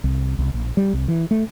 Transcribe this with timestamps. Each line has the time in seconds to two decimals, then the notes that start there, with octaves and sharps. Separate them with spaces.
0.04 C2
0.39 C2
0.54 A#1
0.77 G3
0.93 C2
1.08 E3
1.31 A3